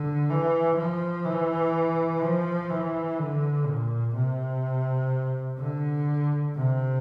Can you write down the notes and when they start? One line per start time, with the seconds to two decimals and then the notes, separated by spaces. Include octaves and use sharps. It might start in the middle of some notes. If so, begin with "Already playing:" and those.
Already playing: D3
0.29 E3
0.77 F3
1.25 E3
2.22 F3
2.70 E3
3.18 D3
3.66 A#2
4.14 C3
5.59 D3
6.55 C3